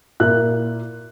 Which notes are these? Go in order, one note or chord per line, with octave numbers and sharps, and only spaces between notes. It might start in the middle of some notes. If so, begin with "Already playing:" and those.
A#2 A#3 E4 F#6